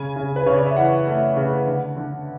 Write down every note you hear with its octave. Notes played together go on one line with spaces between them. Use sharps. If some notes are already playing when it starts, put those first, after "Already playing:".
Already playing: C#3 G#5
C#3
B4
C#3 C#5
D5
E5
E3 F#5
A3
C#3
D3
D3